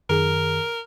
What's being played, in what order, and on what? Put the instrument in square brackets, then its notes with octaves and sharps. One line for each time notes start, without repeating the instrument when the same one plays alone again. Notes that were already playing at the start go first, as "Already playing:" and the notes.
[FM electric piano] F#2 D#3 G#4 [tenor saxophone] A#4